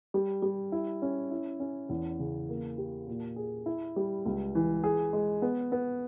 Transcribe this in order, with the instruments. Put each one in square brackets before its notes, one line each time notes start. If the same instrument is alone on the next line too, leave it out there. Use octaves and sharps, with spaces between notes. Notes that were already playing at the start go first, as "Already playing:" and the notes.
[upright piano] G3
G3
E4
C#4
E4
C#4
E2
C#3
A#3
G4
A#2
G#4
E4
G3
C#2
E3
G#4
G#3
B3
B3